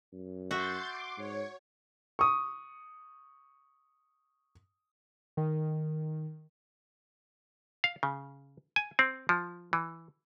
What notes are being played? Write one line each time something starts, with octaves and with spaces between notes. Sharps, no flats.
F#2
F#4 E5 C6 G6 A6
C6 D6
G#2 C#5
C#6 D#6
D#3
F5
C#3
G#5
C4
F3
E3